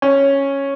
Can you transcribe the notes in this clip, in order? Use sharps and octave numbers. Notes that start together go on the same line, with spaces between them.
C#4